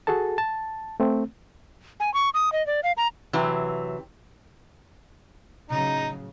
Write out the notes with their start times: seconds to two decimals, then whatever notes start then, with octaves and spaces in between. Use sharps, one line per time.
0.07 F#4 G#4 A4 A5
0.38 A5
1.00 A3 C4
2.00 G#5
2.14 C#6
2.34 D#6
2.52 D#5
2.67 D5
2.83 F5
2.97 A#5
3.33 C3 E3 F#3
5.70 A2 C#3 F#3 D#4 A#5